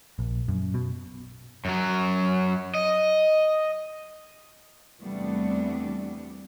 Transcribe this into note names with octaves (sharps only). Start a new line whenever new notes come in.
A#1
F#2
B2
F#2 F#3
D#5
E2 C3 G3 A3 B3 D4